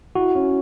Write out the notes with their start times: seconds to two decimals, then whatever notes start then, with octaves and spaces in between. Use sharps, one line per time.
0.15 E4 F#4
0.35 C#4